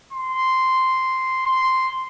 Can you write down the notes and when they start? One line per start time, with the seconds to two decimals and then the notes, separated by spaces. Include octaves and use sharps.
0.13 C6
1.46 C6